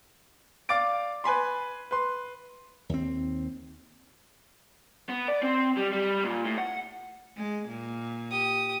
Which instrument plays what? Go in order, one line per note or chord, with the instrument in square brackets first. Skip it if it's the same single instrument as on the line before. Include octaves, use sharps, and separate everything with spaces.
[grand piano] D5 F5 D6 A6 D7
B4 G#5 B5 C6
B4 C6
[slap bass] D#2 C4
[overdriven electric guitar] B3
D5
C4
G3
G3
A#2
A2
F#5
[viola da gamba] G#3
A#2
[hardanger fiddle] G4 D#6